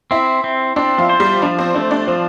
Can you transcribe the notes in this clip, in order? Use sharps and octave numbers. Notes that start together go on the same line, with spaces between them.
C4 E4 E5
C4
C4 D4 D5
F3 F4
C5
G3 G4
F3 D4 D5
C4 C5
A3 D4 D5
D4 D5
F3 C4 C5